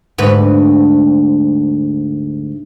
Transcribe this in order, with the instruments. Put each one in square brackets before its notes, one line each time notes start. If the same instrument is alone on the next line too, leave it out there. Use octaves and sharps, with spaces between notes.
[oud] D2 G#2 B4